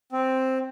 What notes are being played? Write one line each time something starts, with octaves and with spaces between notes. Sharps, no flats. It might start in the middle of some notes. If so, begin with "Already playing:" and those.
C4